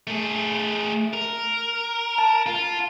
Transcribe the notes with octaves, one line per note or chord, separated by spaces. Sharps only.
A3 G#4
A#4
A5
F4